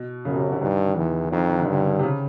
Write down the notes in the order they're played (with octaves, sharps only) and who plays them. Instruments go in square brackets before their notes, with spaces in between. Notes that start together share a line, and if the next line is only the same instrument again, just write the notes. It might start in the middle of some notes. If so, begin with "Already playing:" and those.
Already playing: [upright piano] B2
[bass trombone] F#2 [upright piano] C#3
[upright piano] C3
C#3
D3
[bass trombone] G2 [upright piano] D#3
[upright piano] D#3
[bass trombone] E2 [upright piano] E3
[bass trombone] F2 [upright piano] D#3
[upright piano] D#3
D3
[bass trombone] G2 [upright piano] C#3
[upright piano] D3
C3
C#3